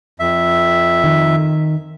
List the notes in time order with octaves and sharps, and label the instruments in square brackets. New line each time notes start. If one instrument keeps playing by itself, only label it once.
[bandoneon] F2 E5
[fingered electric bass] D#3